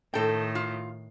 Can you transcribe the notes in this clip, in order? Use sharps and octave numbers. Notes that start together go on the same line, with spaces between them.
A2 D#3 A4 G5
F4